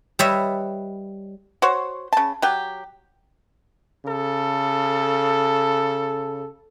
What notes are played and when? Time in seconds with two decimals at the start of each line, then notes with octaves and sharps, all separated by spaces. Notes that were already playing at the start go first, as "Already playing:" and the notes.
0.19 G3 B4 C#5 D#5 E5
1.62 F#4 C5 C#5
2.13 C#3 A5
2.42 F#3 G4
4.06 C#3 A4